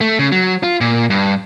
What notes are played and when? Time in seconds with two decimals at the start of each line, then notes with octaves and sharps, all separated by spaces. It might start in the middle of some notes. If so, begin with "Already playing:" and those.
0.01 A3
0.19 C#3
0.32 F#3
0.63 F4
0.81 A#2
1.10 G2